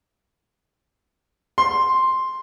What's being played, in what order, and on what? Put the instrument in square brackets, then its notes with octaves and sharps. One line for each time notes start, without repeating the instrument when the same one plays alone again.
[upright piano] C6